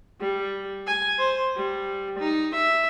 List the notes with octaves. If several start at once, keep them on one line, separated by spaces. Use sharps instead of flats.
G3
G#5
C5
G3
D#4
E5